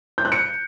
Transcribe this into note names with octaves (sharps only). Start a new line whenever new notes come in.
G6
F#6
C#7